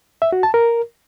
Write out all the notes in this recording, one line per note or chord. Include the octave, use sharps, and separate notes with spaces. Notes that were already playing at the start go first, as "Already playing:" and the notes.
E5
F#4
A5
A#4